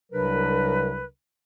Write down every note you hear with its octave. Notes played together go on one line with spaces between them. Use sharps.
C2 C3 F#3 D4 A#4 B4